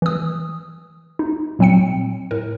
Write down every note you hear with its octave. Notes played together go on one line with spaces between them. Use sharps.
E3 D#6
D#4
A#2 F#3 C4 G5 C#7
A2 A#4